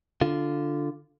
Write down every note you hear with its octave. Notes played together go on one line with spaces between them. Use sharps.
D3 F4